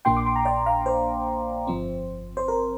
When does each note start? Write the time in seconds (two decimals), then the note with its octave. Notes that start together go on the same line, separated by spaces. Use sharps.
0.05 A#1 A#2 A#3 D4 G5 C6
0.17 D6
0.26 C6
0.36 A#5
0.45 D5 G5
0.66 F5 A#5
0.86 C5
1.67 G1 F2 F3 C4
2.37 C5
2.48 A#4